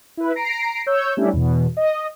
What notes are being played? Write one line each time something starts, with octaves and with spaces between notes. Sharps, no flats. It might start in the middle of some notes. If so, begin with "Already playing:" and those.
E4 B4
A#5 A#6 C7 D7
C#5 E6 G6
G3 A3 C#4 D4 E4
E2 B2
D#5